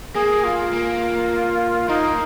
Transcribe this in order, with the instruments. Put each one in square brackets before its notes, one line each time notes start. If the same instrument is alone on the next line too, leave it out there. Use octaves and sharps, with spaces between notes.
[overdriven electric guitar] A#3 [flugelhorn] G#4
[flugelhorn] F4
[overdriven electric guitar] A#3
[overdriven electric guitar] A#3 [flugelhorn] D#4